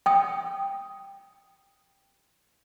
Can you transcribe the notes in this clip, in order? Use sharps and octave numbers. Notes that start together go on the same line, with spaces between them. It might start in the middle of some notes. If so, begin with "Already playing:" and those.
G5 D#6